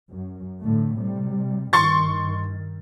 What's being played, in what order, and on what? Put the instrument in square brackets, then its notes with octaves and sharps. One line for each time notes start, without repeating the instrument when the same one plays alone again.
[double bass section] F#2
A2 D3 A3
C3 G3
[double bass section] G2 D#3 [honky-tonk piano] C6 C#6 A6